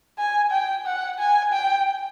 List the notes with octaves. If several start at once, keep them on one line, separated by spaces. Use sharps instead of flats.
G#5
G5
F#5
G#5
G5